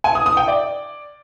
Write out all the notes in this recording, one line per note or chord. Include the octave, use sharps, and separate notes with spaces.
G#5
D#6
D#6
G5
D5